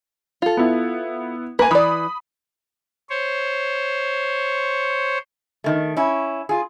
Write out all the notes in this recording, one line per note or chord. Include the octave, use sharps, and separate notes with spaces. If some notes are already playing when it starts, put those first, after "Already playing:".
F4 A4
B3 E4
A#3 B4 G#5 A#5
E3 D5 B5 D#6
C5 C#5
D#3 A3
C#4 E4
F4 G#4